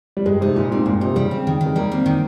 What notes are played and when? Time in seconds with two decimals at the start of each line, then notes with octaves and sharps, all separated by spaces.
0.17 G3
0.26 G2 G#3
0.41 C3 D#4
0.56 A#2 G3
0.71 G#2 C4
0.86 G2 A#2
1.01 C3 D#4
1.16 C#3 G3
1.31 C4
1.47 D#3
1.61 D#3
1.66 G#3
1.76 G3 A#3
1.92 C4
2.06 D#3